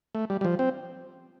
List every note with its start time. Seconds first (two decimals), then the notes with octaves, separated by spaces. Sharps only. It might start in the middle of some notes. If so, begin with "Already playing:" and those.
0.15 A3
0.30 G3
0.41 G3
0.45 F3
0.59 C4